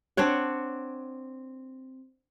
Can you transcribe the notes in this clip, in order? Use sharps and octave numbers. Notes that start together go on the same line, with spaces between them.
C4 D4 C#5 F#5